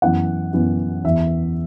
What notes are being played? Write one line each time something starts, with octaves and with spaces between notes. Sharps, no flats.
F#2 E3 B3 F#5
F#2 E3 B3
E2 E3 B3 E5